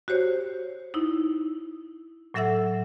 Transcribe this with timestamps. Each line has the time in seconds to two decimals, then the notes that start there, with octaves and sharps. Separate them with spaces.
0.08 F#4 G4 C5 C#5
0.94 D#4 E4
2.34 A2 F#3 A4 E5 F#5 E6